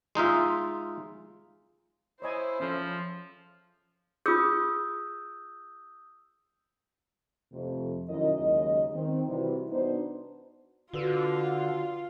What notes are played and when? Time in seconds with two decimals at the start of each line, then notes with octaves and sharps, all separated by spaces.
0.15 G#3 D#4 F4 E5
2.22 E4 C5 C#5 D#5 G#5
2.60 F3 C#4 A4 E5
4.26 F4 G#4 D#6 E6 G6
7.52 F2 C3 A3
8.09 F#2 D#3 E4 A#4 D#5
8.38 D#2 C#3 F#3 G#3 D#5
8.93 D#3 C4
9.28 C3 E3 G3 E4 F#4 B4
9.70 B3 D4 D#4 F#4 C5
10.93 D3 F4 F#4 B4 E6